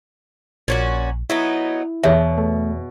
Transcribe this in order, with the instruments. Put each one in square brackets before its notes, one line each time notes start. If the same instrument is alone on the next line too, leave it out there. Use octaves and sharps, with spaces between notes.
[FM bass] A#1 [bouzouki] A#2 C#4 F#4
[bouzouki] F#3 B3 D#4 [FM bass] E4
[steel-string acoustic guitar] E2 [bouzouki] B2 [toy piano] G#4 C#5 E5
[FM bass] A3